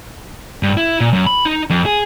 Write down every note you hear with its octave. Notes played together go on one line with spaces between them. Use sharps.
G2
E4
A#2
F#2
B5
D#4
F2
G#4